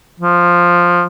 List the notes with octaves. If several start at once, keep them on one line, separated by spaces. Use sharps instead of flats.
F3